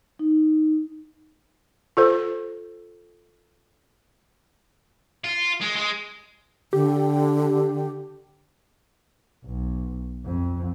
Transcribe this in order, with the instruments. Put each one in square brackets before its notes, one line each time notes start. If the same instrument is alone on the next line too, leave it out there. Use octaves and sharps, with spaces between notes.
[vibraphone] D#4
[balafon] F4 A4 C5
[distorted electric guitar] F4
G#3
G#3
[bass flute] D3 [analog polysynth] G4
[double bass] B1
F2